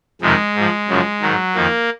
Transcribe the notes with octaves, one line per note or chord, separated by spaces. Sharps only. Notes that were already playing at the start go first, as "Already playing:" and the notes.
F2 C3 D#3 G#3
G#2 F3
F#2 C#3 F3
G#2 D#3 F#3
F2 D#3 A#3